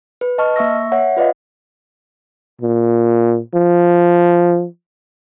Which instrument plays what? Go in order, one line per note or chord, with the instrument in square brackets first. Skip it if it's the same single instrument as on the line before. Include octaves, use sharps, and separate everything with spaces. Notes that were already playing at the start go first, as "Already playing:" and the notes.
[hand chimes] B4
D#5 A5 C#6 F6
A#3 E5 C#6 E6 A#6
C#5 E5 F#5
F4 B4 D5 D#5 F5
[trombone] A#2
F3